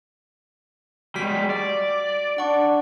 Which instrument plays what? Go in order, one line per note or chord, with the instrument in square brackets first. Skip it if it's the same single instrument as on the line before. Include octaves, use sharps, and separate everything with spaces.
[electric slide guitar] G3 G#3 [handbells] F#4 B6
[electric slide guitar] D5
[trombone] D4 [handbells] F#5 C#6